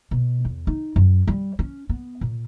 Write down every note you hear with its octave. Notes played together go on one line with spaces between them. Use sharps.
B2
E2
D#4
F#2
G3
C#4
B3
A#2